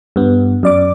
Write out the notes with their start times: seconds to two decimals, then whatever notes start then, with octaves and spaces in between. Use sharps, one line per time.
0.16 G2 B3
0.63 F#2 D5 D6